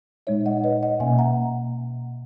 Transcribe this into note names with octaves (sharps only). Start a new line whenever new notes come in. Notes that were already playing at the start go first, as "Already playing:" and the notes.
A#2 G#3 D#4 C#5 E5
D#5 F#5
B4 D#5
D#5 F#5
B2 A#3 C#4 E5 G#5
F#5 A#5